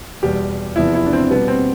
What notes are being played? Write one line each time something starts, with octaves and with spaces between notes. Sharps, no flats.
E2 B2 G3 G4
E2 C3 F3 E4
E4
D4
C4
B2 G3 B3
C4